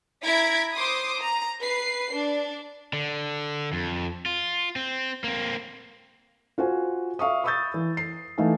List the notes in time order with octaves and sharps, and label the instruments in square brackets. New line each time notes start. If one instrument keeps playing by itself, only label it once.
[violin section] E4 A#5 G#6 B6 D7
C5 C6 D6 D#6
A#5
B4 C7
D4
[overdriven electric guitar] D3
F2
F4
C4
A#3 C4
[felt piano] F4 F#4 C5 G#5
E5 F5 C#6 D#6
B5 C#6 D#6 E6 G6 A6
E3
C7
E3 A3 D#4 F5 G#5